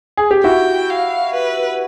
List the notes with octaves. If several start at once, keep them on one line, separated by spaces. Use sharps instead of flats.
G#4
G4
E4 F#4 G5
F5
B4